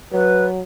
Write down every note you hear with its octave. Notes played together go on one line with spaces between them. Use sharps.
F#3 B4